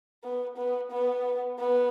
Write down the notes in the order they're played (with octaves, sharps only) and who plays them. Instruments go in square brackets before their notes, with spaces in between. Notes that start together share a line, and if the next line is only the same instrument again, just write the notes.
[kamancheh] B3
B3
B3
B3